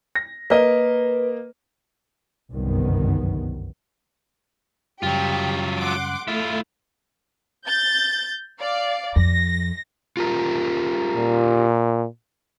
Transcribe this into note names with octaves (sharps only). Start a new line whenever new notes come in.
A#6
A#3 A#4 B4 D#5
G1 C2 F#2 D#3 B3
F#2 C#3 F#3 G3 F4 G4
F#5 C6 D6
A3 E4 F4
G6 A6
D5 F5
F2 A#6
F4 G4 A#4
A#2